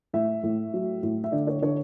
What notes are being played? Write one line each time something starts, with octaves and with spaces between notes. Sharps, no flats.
A2 E5
A2
F#3
A2
E5
D3 D5
C#5
D3 C#5